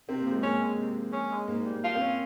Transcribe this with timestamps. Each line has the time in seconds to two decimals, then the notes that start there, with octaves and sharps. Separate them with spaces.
0.08 C3 C4
0.20 A#3
0.25 F3
0.32 G#3
0.43 A#3 C#4
0.61 G#3
0.78 C3
0.96 F3
1.13 C#4
1.31 G#3
1.47 G#2 A#3
1.65 G3
1.71 A#3
1.84 F4
1.95 C4
2.01 C#4